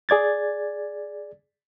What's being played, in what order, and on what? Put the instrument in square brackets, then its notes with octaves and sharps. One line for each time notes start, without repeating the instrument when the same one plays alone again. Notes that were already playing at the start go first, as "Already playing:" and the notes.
[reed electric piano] G#4 D5 G#6 A6